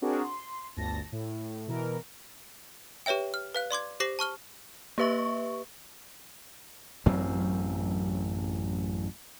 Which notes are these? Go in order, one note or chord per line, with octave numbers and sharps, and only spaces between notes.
C4 D4 F#4 G#4 A#4
C6
G1 D2 A5 A#6
A2
B2 E3 A#4
G4 B4 C#5 E5 G5
F6
B4 F5 F#6
D5 C6 D6 G#6
G4 C5 D6 A#6 C7 F#7
A5 C#6 F6 G7
A#3 G4 B4 E5 C#6
A1 F#2 F#3 C4